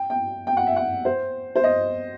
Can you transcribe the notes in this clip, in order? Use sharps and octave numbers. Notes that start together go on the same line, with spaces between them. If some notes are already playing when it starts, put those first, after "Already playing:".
Already playing: G5
G5
G5
F#5
E5
F#5
C5
C5
D#5